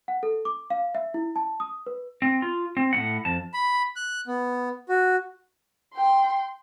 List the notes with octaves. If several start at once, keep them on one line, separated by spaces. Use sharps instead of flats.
F#5
A4
D6
F5
E5
E4
A5
D#6
B4
C4
F4
C4
A2 C4 F#5
F2 A5
B5
F#6
B3
F#4
G5 C6